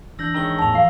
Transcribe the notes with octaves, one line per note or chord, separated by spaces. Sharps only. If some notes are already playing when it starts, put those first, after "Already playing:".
E3 D4 E6 G6 A#6 F#7
D#3 G#3 C#4 A#5 E6 G7
E2 A2 A5 E6 F7
E3 F3 F5 C7